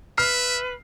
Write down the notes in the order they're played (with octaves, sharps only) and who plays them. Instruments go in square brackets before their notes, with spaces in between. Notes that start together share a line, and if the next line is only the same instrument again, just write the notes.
[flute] B4 [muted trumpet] E5 [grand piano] F6 C7